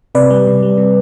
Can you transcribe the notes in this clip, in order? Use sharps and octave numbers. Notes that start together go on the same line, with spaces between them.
C3 B4 D5
G3
C3
G3
C3